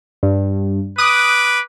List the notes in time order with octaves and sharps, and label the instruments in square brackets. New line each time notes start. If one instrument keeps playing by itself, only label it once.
[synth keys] G2
[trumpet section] B4 D6 [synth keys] D#6 F#6